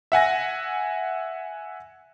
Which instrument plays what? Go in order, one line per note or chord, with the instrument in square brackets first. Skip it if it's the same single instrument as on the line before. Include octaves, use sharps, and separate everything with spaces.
[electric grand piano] E5 F#5 G#5 A#6